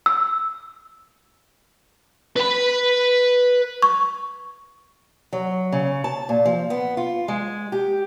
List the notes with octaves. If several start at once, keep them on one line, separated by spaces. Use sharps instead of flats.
E6
B4 B5
C#6
F#3
C#3
A5
A#2
F3
B3
F4
G#3
G4